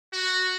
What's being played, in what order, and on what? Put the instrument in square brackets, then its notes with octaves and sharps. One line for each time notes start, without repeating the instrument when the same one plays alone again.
[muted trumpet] F#4